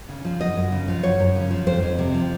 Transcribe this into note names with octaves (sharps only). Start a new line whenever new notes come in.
C#3
F3
F#2 D#5
F#2
C#3
F3
F#2 C#5
F#2
C#3
F3
F2 C5
F2
C3
F3